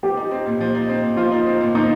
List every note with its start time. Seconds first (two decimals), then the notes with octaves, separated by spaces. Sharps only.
0.03 F3 G4
0.17 D#4
0.31 C4
0.46 A#2
0.61 F3
0.75 D#4
0.89 C4
1.03 A#2
1.17 F3 F4
1.32 D#4
1.46 C4
1.61 A#2
1.75 F3 D#4